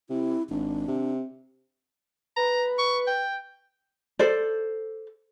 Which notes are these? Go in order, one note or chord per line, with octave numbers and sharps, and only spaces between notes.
C3 E4
G#1 D4
C3
B4 A#5
C#6
G5
A4 C5 D5